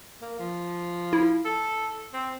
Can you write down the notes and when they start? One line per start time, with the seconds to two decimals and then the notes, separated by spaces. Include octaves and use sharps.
0.22 A#3
0.39 F3
1.13 E4
1.45 A4
2.13 C4